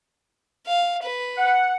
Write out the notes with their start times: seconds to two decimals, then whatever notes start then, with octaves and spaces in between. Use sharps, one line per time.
0.67 F5
1.03 B4
1.38 F#5